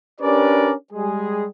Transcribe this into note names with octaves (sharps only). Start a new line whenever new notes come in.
C#4 D4 G4 A#4 B4 D5
G3 G#3 G#4